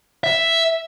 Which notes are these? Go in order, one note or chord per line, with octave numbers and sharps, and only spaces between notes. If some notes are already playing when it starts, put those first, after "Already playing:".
E5